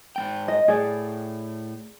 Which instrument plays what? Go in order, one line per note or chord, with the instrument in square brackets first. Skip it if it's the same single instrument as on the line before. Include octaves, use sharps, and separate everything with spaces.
[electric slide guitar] G#2 G#3 G5
[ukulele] D#5
[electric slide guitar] A2 [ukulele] G#4 D5